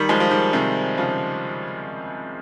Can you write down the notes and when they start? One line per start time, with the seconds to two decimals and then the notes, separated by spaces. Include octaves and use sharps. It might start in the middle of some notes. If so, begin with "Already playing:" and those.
Already playing: D#3 G3
0.09 F3 G#3
0.20 F3
0.31 D#3 G3
0.53 C3 D#3
0.98 C#3 F3